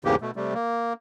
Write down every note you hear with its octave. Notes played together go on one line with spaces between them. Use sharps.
E2 G#2 C#3 E3 A#3 G4
B2 A3
C3 G3 A3
A#3